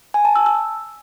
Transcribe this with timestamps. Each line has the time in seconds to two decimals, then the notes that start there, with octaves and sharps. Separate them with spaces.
0.14 G#5
0.25 A5
0.36 E6
0.46 E6